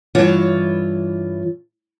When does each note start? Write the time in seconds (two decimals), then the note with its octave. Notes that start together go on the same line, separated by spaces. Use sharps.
0.15 G2 E3 F4 C#5 E5